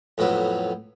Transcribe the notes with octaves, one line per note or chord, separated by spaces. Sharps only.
F2 A2 F#3 B3